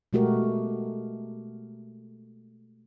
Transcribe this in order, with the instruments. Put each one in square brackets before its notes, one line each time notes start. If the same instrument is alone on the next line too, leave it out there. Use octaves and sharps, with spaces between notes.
[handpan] B2 G#3 A3 F#4 G4 A#4